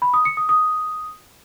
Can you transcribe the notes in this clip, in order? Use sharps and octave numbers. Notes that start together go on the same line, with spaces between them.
B5
D#6
C#7
D#6
D#6